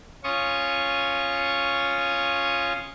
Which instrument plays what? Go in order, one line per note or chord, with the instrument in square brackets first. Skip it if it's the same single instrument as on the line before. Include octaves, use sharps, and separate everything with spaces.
[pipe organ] C#4 F4 C#6 D#6